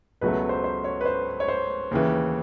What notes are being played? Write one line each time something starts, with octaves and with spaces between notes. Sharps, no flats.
C#2 B2 F#3 A3 B4
C5
C5
C#5
B4
C5
C#5
C5
D#2 C#3 E3